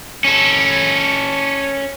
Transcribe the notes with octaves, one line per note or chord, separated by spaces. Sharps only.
C#4 A4